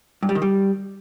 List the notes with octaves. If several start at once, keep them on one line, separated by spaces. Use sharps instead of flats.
G2
G3
D#3
G3